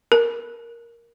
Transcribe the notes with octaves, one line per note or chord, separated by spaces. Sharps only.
A#4